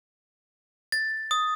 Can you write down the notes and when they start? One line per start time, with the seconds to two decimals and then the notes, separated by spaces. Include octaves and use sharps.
0.92 A6
1.31 D#6